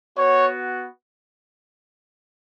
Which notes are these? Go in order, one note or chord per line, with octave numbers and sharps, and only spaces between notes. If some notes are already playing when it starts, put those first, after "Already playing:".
B3 F#4 C#5